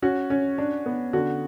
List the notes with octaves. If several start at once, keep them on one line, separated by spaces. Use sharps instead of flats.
C#4 F#4
C#4
D4
B3
D3 F#4